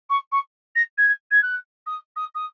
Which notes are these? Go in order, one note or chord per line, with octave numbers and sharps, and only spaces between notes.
C#6
C#6
A#6
G#6
G#6
F#6
D#6
D#6
D#6